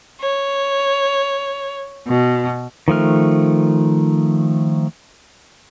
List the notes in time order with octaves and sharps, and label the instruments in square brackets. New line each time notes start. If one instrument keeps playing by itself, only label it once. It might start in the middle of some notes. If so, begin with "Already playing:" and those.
[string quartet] C#5
B2
[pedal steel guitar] D#3 F3 A3 F6